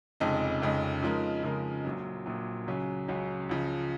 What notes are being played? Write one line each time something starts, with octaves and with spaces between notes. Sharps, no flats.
F1 F2 C#3 G#3 D#4
F1 F2 C#3 G#3 D#4
C#3 F3 G#3 D#4 A#4
C#3 F3 G#3 D#4 A#4
A#1 A#2 F#3
A#1 A#2 F#3
C#2 C#3 F#3 C#4
C#2 C#3 F#3 C#4
C#2 C#3 F3